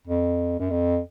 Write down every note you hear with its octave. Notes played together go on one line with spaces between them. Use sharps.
F2
F#2
F2